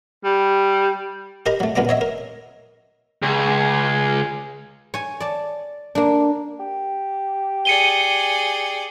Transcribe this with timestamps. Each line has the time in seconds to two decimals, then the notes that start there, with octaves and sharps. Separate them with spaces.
0.24 G3
1.46 G4 A#4 D#5 A#5 B5
1.60 F#3 A3
1.75 C#2 A#2 F#3 B3 A#5 D6
1.89 C#5 D#5 E5
2.01 A#4
3.22 C#2 G#4
4.94 C#5 G#5
5.20 D5 A5
5.95 A#3 D4
6.60 G4
7.65 G#4 D5 C#7 D#7 G7